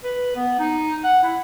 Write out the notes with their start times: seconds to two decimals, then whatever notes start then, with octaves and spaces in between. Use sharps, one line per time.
0.04 B4
0.36 B3
0.59 D#4
1.04 F#5
1.23 E4